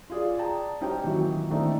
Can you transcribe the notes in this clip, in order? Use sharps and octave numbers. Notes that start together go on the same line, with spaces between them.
F4 G#4 D5
D5 G5 A5 A#5
C#4 D#4 G4 C5 G5
A#2 D#3 E3 F#3
D#3 E3 A3 C4 D4 D#4